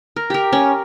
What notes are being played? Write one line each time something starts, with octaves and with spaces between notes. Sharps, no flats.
A#4
G4 A#4
C#4